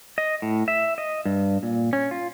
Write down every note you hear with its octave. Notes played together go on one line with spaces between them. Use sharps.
D#5
A2
E5
D#5
G2
A#2
C#4
F4